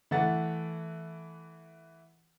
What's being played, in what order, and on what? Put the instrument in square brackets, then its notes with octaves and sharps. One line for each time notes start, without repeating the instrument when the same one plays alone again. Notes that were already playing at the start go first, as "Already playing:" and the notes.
[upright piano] E3 A3 F#5 A6